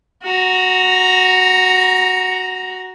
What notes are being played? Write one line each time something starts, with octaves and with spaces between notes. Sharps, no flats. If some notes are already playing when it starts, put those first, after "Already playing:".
F#4 A#5